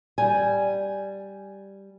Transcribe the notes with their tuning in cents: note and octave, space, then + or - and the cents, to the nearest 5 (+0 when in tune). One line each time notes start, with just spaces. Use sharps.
G3 +0 G#5 +0